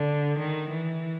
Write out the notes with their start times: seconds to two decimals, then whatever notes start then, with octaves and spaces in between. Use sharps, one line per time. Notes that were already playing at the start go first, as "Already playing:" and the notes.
Already playing: D3
0.38 D#3
0.70 E3